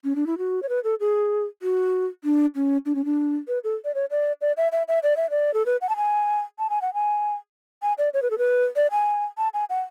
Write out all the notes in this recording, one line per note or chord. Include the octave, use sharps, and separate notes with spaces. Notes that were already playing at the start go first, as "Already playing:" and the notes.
C#4
D4
E4
F#4
C#5
B4
A4
G#4
F#4
D4
C#4
D4
C#4
D4
B4
A4
D5
C#5
D5
D5
E5
E5
E5
D5
E5
D5
A4
B4
F#5
A5
G#5
A5
G#5
F#5
G#5
G#5
D5
C#5
B4
A4
B4
D5
G#5
A5
G#5
F#5